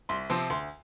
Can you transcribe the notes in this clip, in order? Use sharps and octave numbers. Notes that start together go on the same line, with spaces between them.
C2 C6
C3 F3 C4 C6
D2 C6